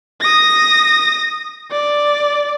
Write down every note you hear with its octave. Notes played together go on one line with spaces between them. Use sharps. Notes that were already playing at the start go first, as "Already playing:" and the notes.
D#6 A#6
D5